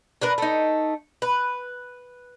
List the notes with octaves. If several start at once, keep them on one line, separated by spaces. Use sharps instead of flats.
D4 A#4 B4
A3 D#4
B4